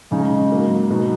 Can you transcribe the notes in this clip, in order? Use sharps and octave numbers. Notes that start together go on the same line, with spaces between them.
C#3 G#3 D#4
G#2 F#3 A#3
B2 F#3 B3 D#4